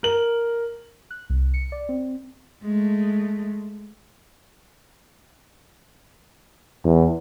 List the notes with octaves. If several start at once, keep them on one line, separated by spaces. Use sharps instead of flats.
A#4 F#7
F#6
C2
C#7
D5
C4
G#3 A3
E2